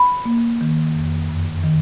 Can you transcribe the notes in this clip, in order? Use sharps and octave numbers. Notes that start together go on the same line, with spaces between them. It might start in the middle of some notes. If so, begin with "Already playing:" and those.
Already playing: B5
A#3
D#3
F2
F#2
D#3